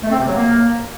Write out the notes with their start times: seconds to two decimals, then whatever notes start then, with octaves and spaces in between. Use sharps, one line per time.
0.03 A3
0.11 C4
0.19 C3
0.27 F#3
0.35 A#3